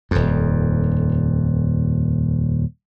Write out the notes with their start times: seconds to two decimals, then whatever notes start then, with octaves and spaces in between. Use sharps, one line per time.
0.11 D#1 F2